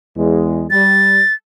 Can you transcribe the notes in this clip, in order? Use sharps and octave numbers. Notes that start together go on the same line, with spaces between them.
E2 G#3
G3 A6